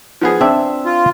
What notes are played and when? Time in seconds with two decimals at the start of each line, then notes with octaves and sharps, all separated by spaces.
0.21 F3 B3 G#4
0.41 C4 D4 E5
0.86 F4